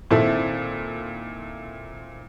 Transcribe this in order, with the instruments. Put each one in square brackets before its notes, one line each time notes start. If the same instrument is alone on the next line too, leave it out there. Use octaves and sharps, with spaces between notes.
[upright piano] A#2 D#3 C4 E4 A4